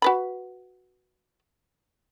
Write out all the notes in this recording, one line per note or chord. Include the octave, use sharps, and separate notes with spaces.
F#4 B4 B5